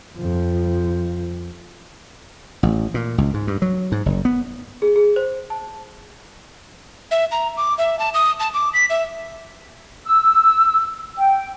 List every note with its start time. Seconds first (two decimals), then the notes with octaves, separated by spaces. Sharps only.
0.18 F2 F3
2.63 A1
2.94 A#2
3.18 C#2
3.34 G#2
3.47 G2
3.62 F#3
3.92 G#2
4.06 F#1
4.25 B3
4.82 G#4
4.96 G#4
5.16 C5
5.50 A5
7.11 E5
7.32 A#5
7.57 D6
7.78 E5
7.99 A5
8.14 D#6
8.40 A5
8.54 D6
8.74 B6
8.90 E5
10.06 E6
11.17 G5